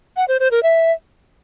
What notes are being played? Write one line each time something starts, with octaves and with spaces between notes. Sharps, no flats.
F#5
C5
C5
A#4
E5